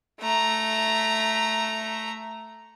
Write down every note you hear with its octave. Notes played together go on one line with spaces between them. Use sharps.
A3 A#5